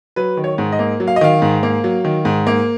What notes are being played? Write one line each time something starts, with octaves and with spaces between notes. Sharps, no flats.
F#3 B4
D#3
C#5
G#2
D#5
A#3
F#3
F5
D#5
D#3 F5
G#2
A#3
F#3
D#3
G#2
A#3